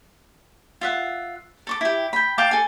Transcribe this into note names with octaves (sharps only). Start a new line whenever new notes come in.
F4 E5 F#5
A4 C#6 D6
E4 G4
G5 B5
F5 G5 A5 D6
A4 G#5